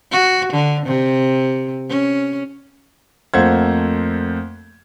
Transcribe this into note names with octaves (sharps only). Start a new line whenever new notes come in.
F#4
D3
C3
C#4
F2 A3 A#3 C5 F#5 G#6